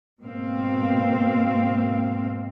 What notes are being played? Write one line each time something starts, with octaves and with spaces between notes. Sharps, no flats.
G#2 B2 A#3 C4 F5